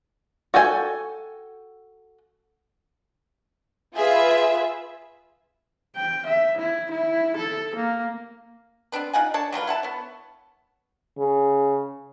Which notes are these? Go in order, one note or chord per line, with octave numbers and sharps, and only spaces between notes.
F#4 A4 G5 G#5
F4 G#4 B4 E5
G5
E5
E4
E4
A4
A#3
B3 C4 D4 B4
D#4 F4 F#5 G#5
D4 C#5 A5
F#3 G3 F4 B4
E4 F#5 A5
B3 C#5
C#3